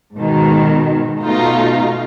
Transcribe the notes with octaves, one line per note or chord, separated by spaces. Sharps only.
G#2 B2 D#3
B2 A3 D#4 F4